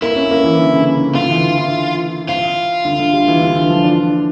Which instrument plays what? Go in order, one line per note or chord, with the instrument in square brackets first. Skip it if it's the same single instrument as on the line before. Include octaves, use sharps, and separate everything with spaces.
[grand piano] A#3 [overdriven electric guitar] E4
[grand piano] C#4
A#3
E3
D3
C#3
D3
D3
[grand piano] D3 [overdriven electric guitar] F4
[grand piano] E3
D3
E3
[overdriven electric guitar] F4
[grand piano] D3
D3
G3
E3
D3
E3
F3
D4